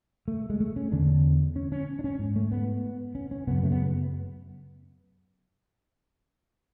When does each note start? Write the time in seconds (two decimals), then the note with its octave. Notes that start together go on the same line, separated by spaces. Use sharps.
0.28 A3
0.50 G#3
0.60 A3
0.76 C#4
0.92 E2 D3 D4
1.56 C#4
1.72 C#4
1.99 D4
2.04 C#4
2.19 G#2
2.36 A3
2.52 B3
3.15 C#4
3.31 C#4
3.47 F#2 C#3 B3
3.63 A3
3.72 B3